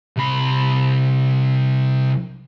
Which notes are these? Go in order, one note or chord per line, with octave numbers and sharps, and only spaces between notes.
C2 B5